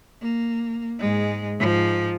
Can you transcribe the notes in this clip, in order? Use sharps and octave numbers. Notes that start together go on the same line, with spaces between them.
A#3
G#2 G#3
G#2 F3